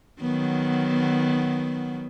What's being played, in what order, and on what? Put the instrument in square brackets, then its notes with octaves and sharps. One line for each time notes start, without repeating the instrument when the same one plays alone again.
[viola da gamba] D#3 F#3 B3